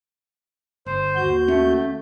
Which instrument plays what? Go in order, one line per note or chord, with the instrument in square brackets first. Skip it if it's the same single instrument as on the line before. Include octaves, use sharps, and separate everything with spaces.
[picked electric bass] G1 [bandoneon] C5
[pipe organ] D#2 F#4 G6
[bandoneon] A3 [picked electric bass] C#4